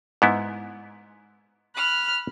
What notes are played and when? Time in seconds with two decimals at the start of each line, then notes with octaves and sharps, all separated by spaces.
0.22 G#2 B3 E4
1.76 B5 F6 F#6